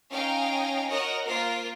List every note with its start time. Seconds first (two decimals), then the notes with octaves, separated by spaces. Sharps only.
0.10 C#4 D#4 F5 G5 G#5 A#5
0.88 F#4 A#4 C#5 D#5 F#5 A#5
1.25 A#3 F4 A#4 C5 C7